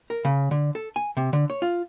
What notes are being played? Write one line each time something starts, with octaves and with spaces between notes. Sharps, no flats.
A#4
C#3
D3
A4
G#5
C3
D3
C#5
F4